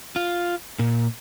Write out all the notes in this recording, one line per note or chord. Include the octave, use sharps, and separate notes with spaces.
F4
A#2